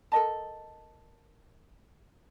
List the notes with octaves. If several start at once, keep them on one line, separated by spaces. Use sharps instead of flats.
A4 A#4 D#5 A5